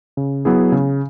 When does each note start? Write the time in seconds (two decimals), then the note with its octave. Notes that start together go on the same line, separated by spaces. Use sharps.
0.17 C#3
0.45 F#3 B3 E4 G#4
0.72 C#3